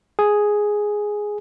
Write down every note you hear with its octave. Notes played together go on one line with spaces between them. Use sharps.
G#4